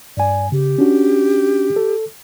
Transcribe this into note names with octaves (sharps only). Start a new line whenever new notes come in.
G2 D5 G#5
C#3 G4
C#4 D4 F#4
A4